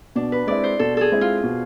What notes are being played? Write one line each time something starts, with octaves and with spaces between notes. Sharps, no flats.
B2 D4
B4
G#3 C4 E4 D5
C5
B2 A4
G#4 A4
G#3 C4 E4
F4
B2